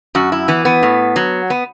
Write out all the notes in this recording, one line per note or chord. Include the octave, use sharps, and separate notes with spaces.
F#2 F#4
E4
E3 B3
B3
A2
F#3
B3